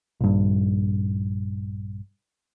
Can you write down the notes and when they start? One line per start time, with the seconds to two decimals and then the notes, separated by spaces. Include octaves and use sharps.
0.21 A#1 G2